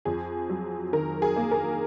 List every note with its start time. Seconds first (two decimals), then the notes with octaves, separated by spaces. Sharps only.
0.05 F2 G#4
0.50 F#3
0.93 D#3 A#4
1.22 G#4
1.36 A#3
1.51 A#4